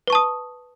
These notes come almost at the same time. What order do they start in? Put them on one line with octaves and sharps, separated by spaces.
B4 C#6 A5 D#6